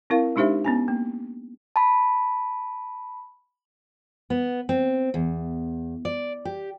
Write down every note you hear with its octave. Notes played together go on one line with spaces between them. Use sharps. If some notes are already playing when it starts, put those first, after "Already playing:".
C4 E4 A#4 F5
G#3 D4 D#4 G4 C5 E5
B3 C#4 G#5
A#3
A5 B5
B3
C4
E2
D5
G4